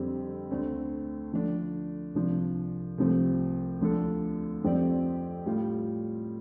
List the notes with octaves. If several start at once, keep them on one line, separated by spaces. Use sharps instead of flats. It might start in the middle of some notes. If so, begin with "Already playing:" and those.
Already playing: F2 D3 G3 C4
D2 D3 A3 C4
D3 F3 A3 D4
C2 C3 F3 D4
C2 C3 F3 A3 C4
D2 D3 F3 D4 A4
F2 F3 C4 G4 D5
A2 G3 F4